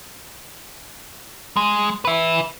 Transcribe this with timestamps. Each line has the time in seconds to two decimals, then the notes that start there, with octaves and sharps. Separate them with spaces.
1.57 G#3
2.05 B4 E5